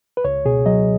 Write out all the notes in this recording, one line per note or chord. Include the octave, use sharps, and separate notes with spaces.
B4
C#2 C#5
B2 G#4
F#3 D#5